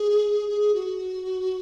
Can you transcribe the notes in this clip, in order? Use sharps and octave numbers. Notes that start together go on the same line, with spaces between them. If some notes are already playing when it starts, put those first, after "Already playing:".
Already playing: G#4
G#4
F#4